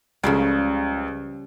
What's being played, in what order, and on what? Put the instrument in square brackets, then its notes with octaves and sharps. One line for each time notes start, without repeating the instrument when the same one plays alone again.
[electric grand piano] C#2 [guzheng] C#3 F3 G3